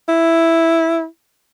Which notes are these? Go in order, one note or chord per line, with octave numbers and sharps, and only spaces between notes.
E4